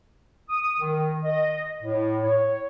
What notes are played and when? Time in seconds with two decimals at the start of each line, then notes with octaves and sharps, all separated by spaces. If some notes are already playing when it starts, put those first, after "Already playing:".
0.49 D#6
0.80 D#3
1.25 D#5
1.83 A2
2.24 C#5